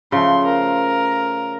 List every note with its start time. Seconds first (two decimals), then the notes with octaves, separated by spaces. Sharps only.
0.12 C#3 F3 A3 C6
0.46 A#4